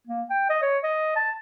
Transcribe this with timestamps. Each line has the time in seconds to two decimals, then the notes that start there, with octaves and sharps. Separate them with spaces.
0.07 A#3
0.30 G5
0.49 D#5
0.62 C#5
0.83 D#5
1.16 A5